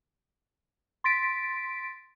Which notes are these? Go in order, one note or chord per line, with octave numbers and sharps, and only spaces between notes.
C6 A6 B6 D7